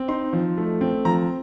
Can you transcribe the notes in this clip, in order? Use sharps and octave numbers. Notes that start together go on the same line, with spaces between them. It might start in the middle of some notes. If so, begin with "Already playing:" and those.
Already playing: C4
D#4 C6
F3
A3
C4
F3 A#5